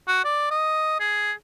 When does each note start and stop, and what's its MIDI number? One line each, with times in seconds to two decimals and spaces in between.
0.08 0.21 66
0.25 0.51 74
0.51 0.96 75
1.00 1.32 68